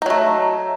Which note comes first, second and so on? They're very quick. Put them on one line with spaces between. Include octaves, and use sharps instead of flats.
D#4 F#3 A3